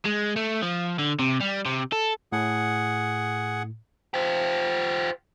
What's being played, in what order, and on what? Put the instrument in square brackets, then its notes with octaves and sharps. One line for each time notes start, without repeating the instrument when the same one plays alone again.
[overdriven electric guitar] G#3
A3
F3
D3
C3
G3
C3
A4
[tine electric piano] A2 [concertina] G#4 F#5
[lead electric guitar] F4 G4 [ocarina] C5